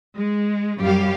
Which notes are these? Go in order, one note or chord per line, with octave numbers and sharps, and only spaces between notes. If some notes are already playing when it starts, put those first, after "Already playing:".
G#3
F#2 G3 G4 F5